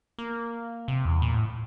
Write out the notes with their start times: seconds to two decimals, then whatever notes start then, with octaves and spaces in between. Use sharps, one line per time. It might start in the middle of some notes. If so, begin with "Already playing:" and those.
0.19 A#3
0.88 C3
1.05 E2
1.22 A#2
1.34 A2